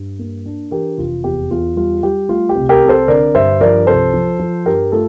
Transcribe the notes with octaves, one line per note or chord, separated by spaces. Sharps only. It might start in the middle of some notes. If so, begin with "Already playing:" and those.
Already playing: G2
A#3
D4
E3 G4 A#4
F1 F4
E2 G4
E2 F4
G3 F4
G3 G4
A3 F4
G4
C2
G4 A#4
C3
A4 C5
D3 A#4 D5
G2 C5 E5
F3 A#4 D5
C2 A4 C5
F3
F3
G2 G4 A#4
A3 F4 A4